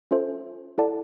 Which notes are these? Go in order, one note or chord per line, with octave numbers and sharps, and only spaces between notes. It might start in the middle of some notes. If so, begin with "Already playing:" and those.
C#4 F4 A4 C5 E5
E4 A4 D5 F#5 A5